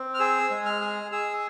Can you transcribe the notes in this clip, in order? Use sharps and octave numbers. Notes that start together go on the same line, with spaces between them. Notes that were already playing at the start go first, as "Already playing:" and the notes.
Already playing: C4
F6
G#4 E6
G#3
F6
G#4
G#4 E6